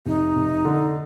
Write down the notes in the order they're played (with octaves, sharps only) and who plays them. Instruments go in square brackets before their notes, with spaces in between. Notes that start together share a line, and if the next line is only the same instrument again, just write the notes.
[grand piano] F1 [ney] D#4
[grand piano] F1
D3